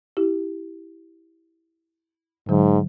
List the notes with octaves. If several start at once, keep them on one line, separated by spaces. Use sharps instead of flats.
E4 G4
G#2 D3 F#3